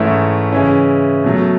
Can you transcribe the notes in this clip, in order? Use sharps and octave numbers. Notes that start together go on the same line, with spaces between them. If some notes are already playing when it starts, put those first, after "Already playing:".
Already playing: G#2 E3 A3 C#4 E4
C#3 E3 G#3 C#4 E4
B2 F#3 A3